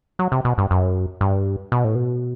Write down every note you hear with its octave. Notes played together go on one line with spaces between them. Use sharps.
F#3
C3
B2
G2
F#2
G2
B2
A2
B2